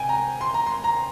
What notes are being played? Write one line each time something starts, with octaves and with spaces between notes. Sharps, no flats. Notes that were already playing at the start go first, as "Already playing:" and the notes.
Already playing: C2 C3 G5 G#5
A#5
C6
A#5
C6
A#5